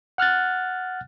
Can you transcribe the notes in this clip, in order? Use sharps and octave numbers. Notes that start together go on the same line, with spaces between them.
F#5 F6 F#6 A6